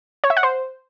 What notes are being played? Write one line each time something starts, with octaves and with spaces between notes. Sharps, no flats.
C#5
E5
F#5
C5